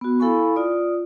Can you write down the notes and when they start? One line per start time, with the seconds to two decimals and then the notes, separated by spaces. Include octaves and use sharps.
0.01 B3 F#4
0.20 E4 A4 F5 G#5 B5 C#6
0.56 F4 D5 D#6